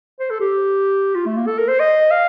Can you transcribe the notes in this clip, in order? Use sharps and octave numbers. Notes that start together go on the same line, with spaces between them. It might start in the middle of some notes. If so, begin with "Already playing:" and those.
C5
A4
G4
F4
A3
A#3
A4
A#4
C5
D#5
F5